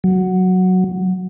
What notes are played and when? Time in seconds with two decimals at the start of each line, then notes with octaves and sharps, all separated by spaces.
0.04 F#3